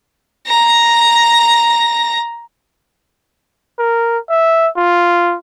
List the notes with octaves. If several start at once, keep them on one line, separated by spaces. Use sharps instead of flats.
A#5 A#6
A#4
E5
F4